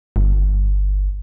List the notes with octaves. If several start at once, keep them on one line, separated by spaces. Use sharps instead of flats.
G1